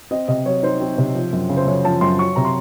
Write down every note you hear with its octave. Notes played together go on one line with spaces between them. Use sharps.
C4 D#5
C3 D#5
F#3 C#5
D#4 C5
C4
C3
F3
F#2
C#3
C5
F#2 C#5
F3 A5
F#2 C6
F#3 C#6
C3 A#5
C6